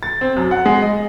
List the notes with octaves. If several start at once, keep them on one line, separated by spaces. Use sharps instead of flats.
A6
C4
F#2
F#5
G#3
D#5